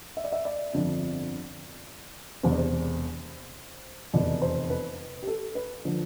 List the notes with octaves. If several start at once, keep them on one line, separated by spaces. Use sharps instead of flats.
E5
D5
E5
D5
G1 F2 D3 F3
E1 E2 C3 C5
D5
C5
F1 E2 B2 D5
C5
B4
G4
A4
B4
D3 F3